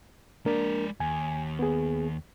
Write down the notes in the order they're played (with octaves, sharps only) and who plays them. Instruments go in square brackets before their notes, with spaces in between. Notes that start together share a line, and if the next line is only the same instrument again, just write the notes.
[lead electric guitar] G#3 D5 [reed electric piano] A#3 D4 A#4
[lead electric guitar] D#2 [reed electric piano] G#5
[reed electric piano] B3 G#4